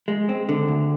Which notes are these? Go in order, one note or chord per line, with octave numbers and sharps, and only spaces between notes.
G#3
C4
D3
D2